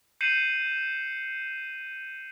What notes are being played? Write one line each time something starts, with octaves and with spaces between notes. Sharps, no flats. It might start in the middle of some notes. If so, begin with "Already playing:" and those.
G6 C7 C#7 D#7 E7 F#7